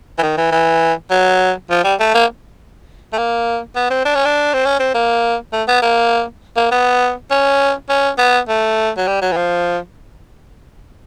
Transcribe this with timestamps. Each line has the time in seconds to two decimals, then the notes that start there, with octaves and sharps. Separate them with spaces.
0.18 E3
0.22 D#3
0.37 E3
0.52 E3
1.11 F#3
1.70 F3
1.84 G3
2.00 A3
2.14 A#3
3.13 A3
3.18 A#3
3.76 B3
3.90 C4
4.05 D4
4.15 C#4
4.25 D4
4.53 C4
4.65 C#4
4.80 C4
4.94 A#3
5.53 A3
5.68 B3
5.82 A#3
6.57 A#3
6.71 B3
7.31 C#4
7.89 C#4
8.18 B3
8.49 A3
8.97 F#3
9.07 G3
9.22 F#3
9.32 E3
9.36 F3